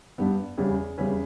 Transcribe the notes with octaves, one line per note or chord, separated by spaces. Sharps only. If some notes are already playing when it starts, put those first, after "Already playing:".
G2 G3 B3
E2 C#3 G3 C#4 G#4
E2 C#3 G3 C#4 G#4 B4